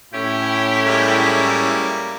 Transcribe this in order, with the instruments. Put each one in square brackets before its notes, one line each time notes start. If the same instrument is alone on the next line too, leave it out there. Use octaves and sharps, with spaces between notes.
[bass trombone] A2 [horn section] C#4 E4 [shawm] G4
[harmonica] G3 G#3 A#3